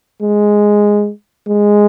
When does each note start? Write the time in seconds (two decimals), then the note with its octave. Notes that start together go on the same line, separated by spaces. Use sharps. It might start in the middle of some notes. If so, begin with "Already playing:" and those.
0.22 G#3
1.48 G#3